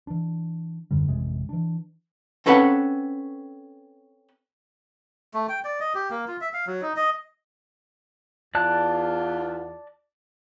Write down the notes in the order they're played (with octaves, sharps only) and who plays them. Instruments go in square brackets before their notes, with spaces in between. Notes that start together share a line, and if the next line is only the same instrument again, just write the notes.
[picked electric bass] E3 D4
D#1 F#2 D3 G3
A1 F2 C3 G#3
E3 D4
[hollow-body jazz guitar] C4 C#4 A4 B4 F5 F#5
[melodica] A3
G5
D5
D#5
G4
A#3
F4
E5
F5
F#3
D#4
D#5
[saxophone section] E2 F4 [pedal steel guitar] D5 A5 F#6